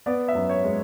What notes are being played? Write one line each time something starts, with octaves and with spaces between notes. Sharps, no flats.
B3 D5
E5
F#2
C#5
G#3